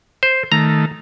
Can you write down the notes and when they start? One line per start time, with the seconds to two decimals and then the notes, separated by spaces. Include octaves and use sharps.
0.23 C5
0.52 D#3 A3 A#5